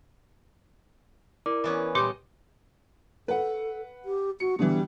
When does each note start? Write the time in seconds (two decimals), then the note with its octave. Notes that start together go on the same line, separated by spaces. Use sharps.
1.46 E4 A#4 D5 D6
1.64 E3 B3 C#4
1.95 A#2 G3 G4 D#5 C6
3.28 A4 B4 F#5
4.05 G4
4.40 F#4 C#7
4.59 B2 D3 E3 G3